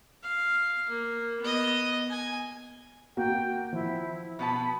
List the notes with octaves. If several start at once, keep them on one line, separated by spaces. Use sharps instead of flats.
F5
A#3
B3 D#5
G#5
A#3 F#4 G5
F3 E4
B2 B3 A5 B5